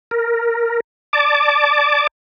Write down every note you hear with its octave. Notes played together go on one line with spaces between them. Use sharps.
A#4
D5 A5 D6